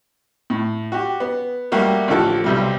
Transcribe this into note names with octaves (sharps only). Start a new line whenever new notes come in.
A2
F#4 G4
B3
G3 A3 A#3 F#4 G4
A1 D3 F3 A4 F#6
B1 C3 G3